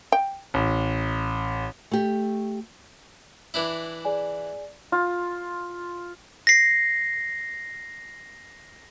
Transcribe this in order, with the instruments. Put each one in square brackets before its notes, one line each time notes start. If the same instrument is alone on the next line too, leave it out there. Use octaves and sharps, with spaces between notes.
[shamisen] G5
[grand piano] A1
[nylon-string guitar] A3 G4
[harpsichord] E3 D4 E4
[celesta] G#4 D5 G#5
[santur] F4
[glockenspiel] A#6 C7